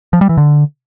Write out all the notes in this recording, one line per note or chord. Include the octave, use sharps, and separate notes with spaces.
F3
G3
E3
D3